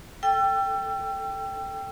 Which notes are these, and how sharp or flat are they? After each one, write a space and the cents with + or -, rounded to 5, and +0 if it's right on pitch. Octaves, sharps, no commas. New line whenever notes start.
A4 +0 G5 +0 E6 +35